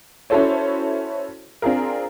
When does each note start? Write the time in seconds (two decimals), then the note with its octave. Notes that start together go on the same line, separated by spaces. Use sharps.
0.30 C#4 E4 F#4 A4 C5 C#5
1.62 C4 D4 F4 G#4 A#4